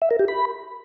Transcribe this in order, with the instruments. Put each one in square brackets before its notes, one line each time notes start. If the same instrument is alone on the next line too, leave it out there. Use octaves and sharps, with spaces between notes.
[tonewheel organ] E5
A#4
G4
B5